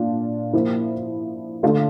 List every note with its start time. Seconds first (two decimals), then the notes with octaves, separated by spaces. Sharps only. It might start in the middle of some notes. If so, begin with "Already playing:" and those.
Already playing: A#2 D4 F4
0.53 F3 A#3 E4
1.63 D3 A3 D4 F4